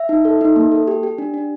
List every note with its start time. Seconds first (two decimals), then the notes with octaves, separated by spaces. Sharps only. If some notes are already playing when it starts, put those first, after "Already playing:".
Already playing: E5
0.09 D#4
0.25 A4
0.41 D#4
0.56 A#3
0.72 A4
0.87 G4
1.03 G4
1.18 D4
1.34 D4